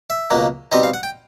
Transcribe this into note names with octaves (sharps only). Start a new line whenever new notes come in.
E5
C#2 B2 F#3 A#3
B2 G3 C4 D#4 D#5
F5
F#5
G5